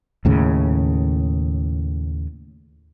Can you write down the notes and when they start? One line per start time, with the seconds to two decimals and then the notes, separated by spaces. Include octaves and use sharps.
0.25 D#2 A2 C#3